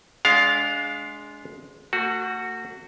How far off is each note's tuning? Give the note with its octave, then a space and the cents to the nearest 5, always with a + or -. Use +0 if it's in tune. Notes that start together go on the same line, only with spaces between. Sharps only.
G#3 +10 D4 -25 F5 +5
A3 +45 F#4 +0